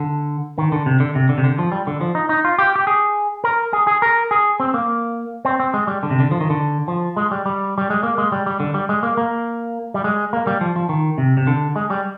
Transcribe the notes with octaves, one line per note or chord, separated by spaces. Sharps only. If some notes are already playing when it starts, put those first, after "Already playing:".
Already playing: D3
D#3
D3
C3
D3
C3
D3
C3
D3
F3
G3
D3
F3
D#4
D#4
F4
G4
G4
G#4
A#4
G#4
G#4
A#4
G#4
C4
A#3
C4
C4
G#3
G3
D3
C3
D3
F3
D#3
D3
F3
G#3
G3
G3
G3
G#3
A#3
G#3
G3
G3
D3
G3
G#3
A#3
A#3
G3
G#3
A#3
G3
F3
F3
D#3
C3
C3
D3
G#3
G3